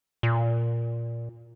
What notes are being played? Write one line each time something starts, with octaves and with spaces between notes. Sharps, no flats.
A#2